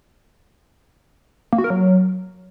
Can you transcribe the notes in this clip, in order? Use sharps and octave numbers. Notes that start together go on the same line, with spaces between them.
A#3
F#4
A#4
F#3